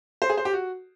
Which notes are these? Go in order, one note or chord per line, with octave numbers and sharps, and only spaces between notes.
C5
G#4
C5
G4
F#4